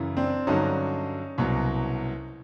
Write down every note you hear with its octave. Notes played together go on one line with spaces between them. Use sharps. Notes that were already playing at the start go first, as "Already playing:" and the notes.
Already playing: F#2 C#3 E3
C4 D4
G2 D3 F#3 C#4 D#4
C2 B2 F#3